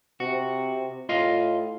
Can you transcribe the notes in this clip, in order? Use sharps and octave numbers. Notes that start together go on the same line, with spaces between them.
C3 F#4
A2 F4 D#5 F5